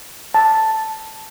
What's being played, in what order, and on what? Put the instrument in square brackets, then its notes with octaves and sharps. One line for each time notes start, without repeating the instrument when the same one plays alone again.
[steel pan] A5